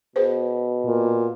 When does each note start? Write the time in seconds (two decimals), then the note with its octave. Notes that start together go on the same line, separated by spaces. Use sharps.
0.16 B2 G#4 B4 C5
0.86 A#2